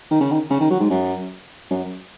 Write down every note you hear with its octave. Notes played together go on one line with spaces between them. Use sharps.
D#3
C#3
D#3
C#3
D#3
F#3
G#2
F#2
F#2